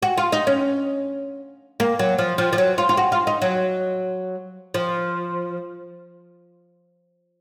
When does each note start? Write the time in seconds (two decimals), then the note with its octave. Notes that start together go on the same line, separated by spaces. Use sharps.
0.02 F#4
0.18 F4
0.32 D#4
0.47 C#4
1.80 A#3
1.99 F#3
2.18 F3
2.38 F3
2.53 F3
2.58 F#3
2.78 F4
2.89 F4
2.97 F#4
3.12 F4
3.27 D#4
3.42 F#3
4.74 F3